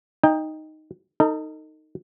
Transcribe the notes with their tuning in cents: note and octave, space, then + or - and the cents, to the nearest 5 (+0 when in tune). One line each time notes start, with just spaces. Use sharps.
D#4 +0 G5 +25
D#4 +0 A4 +40